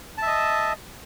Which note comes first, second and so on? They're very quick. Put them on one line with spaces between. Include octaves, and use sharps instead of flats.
A5 E5 D#5